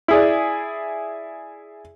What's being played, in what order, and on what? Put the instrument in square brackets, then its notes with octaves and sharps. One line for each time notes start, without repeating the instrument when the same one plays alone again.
[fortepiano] E4 G#4 D5